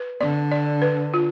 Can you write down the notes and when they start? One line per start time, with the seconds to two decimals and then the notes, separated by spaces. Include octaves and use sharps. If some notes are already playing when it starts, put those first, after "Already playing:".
Already playing: B4
0.21 D3 D5
0.51 D5
0.82 B4
1.14 F4